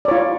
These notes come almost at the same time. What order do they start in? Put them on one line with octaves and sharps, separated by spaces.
D5 C#5 F4